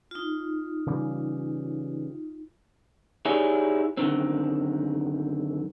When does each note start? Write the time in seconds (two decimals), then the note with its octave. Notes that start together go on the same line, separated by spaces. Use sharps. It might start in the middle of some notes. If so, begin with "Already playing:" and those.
0.11 D#4 F4
0.86 C#3 E3 G3
3.25 D#4 E4 G4 G#4 C#5 D5
3.97 F#2 A2 D3 D#3 C4